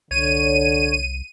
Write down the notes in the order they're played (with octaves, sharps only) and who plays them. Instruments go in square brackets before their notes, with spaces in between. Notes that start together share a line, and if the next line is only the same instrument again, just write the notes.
[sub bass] C2 [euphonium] D3 [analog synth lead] C#5 [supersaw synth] D#7